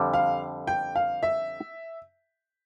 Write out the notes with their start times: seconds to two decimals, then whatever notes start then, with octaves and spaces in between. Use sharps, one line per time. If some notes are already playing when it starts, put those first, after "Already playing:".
Already playing: F2 D3 G3
0.13 F5
0.67 G5
0.95 F5
1.23 E5